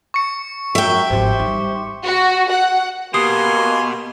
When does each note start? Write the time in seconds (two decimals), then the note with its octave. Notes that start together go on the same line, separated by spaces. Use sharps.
0.14 C#6 C#7
0.75 F#2 F#3 F#4 E5 G5
1.10 G#1 F3 G4 C5
1.39 G3 D#4
2.04 F#4
2.51 F#5
3.14 B2 A#3 G4 G#5 C6 D#6 C7